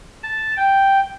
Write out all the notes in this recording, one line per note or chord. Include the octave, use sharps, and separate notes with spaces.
A5
G5